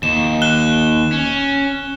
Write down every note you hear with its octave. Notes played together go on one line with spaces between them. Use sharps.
D#2 E7
F#6 E7 G7
C#4